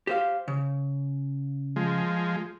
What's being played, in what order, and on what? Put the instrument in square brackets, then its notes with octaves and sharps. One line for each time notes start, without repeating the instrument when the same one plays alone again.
[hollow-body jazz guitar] G4 C5 F5
C#3
[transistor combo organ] F3 G#3